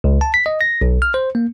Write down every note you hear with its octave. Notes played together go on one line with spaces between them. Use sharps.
C#2
A5
B6
D#5
A#6
B1
F6
C5
A#3